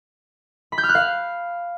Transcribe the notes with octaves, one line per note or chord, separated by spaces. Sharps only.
B5
G6
F6
F#6
F5